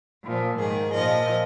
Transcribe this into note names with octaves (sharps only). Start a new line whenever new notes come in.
A#2 F3
G#2 D#3 G#4
A#2 F3 D#5